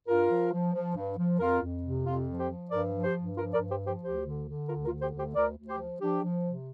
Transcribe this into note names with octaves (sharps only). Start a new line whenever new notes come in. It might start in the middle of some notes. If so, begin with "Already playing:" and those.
G2 F4 A#4
F3
F3
F3
G2
F3
F2 F4 A#4
F2
C3
F2 F4
F3
G4 C5
F3
G2 A#4 D5
F3
G4 C5
G2
F3 F4 A#4
A#4 D5
G2
G4 C5
F3
G4 C5
D2 G4 C5
D3
D3
D2 F4 A#4
F4 A#4
D3
G4 C5
D2
G4 C5
D2 A#4 D5
D2
G4 C5
F3
F3 D4 G4
F3
C3